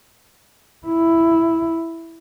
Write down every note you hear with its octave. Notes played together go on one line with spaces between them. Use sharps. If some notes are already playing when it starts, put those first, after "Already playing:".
E4